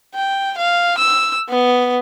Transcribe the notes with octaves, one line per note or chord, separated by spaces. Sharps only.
G5
F5
E6
B3